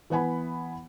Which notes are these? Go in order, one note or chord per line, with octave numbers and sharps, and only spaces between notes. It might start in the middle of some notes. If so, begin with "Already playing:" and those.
E3 B3 F#5 G#5 B5